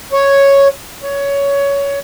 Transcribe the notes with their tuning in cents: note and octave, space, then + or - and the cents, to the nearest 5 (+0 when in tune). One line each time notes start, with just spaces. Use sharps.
C#5 +0
C#5 +15